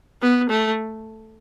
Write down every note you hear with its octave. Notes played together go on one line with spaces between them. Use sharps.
B3
A3